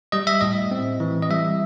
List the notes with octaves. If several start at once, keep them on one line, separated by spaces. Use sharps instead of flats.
G3 D#5
E5
A2 D#5
C4
E3
D#5
G3 E5